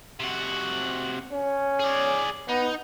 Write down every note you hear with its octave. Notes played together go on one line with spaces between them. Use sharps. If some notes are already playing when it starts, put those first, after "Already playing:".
C3 F#4
C#4
G#4 D5
B3 D#4